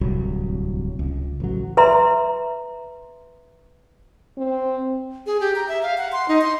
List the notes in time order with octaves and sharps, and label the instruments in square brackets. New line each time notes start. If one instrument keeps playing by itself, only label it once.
[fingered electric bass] D1 C2 F#3
C#2
A1 F#3
[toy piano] B4 E5 A#5 C6
[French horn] C4
[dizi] G#4
G4
A#5
E5
F5
F#5
C6
D#4
C6